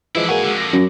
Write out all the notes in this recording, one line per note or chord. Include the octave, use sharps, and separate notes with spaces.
E3 F3 G#3 D4 E4
G#2 G#3 A#3 F#4 G#5
F2 D3
D6 A#6
F#2